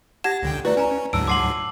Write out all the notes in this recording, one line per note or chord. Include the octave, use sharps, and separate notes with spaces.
G4 F#5 A5 G#6 A#6 E7
C#2 D3 G5
A3 E4 F#4 B4 D5
C#4 G#5 A#5
D2 G#2 F#3 A5 E6 D7
F#5 A5 C6 D6 C7 F#7